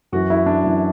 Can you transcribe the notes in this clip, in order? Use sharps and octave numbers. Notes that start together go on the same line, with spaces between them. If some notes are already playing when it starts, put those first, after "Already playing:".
F#2 E3 F#4
E4
D4
F#2 E3